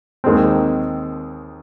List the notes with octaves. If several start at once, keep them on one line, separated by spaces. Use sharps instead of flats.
D#2 D#3 G#3 C4